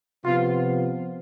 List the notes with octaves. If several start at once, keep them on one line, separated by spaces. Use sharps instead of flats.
C3 F3 B3 F4